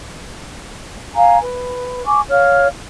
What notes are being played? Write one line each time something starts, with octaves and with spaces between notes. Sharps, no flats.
F5 G#5 A#5
B4
G#5 C#6 D6
C#5 F5 F6